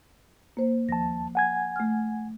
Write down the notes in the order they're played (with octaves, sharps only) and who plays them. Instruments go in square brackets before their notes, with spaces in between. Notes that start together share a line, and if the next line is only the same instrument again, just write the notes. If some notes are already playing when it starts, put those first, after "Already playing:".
[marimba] A#3 C5
[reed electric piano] D#2 A5 [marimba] F3 A#6
[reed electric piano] F#5 G#5 G#6
[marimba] A3 F6